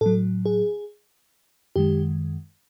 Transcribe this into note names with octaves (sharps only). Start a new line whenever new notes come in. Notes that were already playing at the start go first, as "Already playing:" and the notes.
A2 F#3 A4
G#4
F#2 D#3 G#3 G4